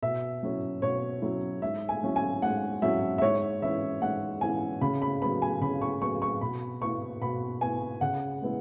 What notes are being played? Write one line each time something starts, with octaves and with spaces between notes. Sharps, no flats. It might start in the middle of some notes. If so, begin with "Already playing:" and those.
B2 E5
F#3 C#4 E4
B2 C#5
F#3 C#4 E4
G#2 E5
G#5
F#3 C#4 E4
G#5
G#2 F#5
F#3 C#4 E4 E5
E5
G#2 C#5
E3 C#4 E4 E5
G#2 F#5
E3 C#4 E4 G#5
C#3 B5
B5
F#3 B3 B5
G#5
C#3 B5
C#6
F#3 B3 C#6
C#6
B2 B5
B3 E4 C#6
B2 B5
B3 E4 G#5
C#3 F#5
G#3 B3 E4